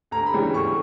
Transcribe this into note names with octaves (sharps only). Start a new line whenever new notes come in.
D2 A#5
B5
C#3 E3 G3
D2 C#6